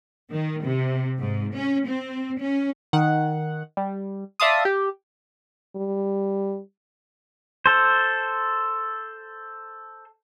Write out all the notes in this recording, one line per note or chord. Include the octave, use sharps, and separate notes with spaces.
D#3
C3
G#2
C#4
C4
C#4
D#3 F#5
G3
D5 E5 F5 A5 C6 D#6
G4
G3
A4 C5